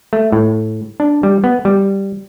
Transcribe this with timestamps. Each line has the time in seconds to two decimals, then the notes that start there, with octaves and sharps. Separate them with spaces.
0.13 A3
0.32 A2
1.00 D4
1.23 G3
1.44 B3
1.65 G3